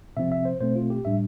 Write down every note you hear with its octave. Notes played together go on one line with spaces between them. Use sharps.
C3 F3 C4 E5
E5
C5
B2 A3 C4 C5
F4
G4
A2 G3 D4 E5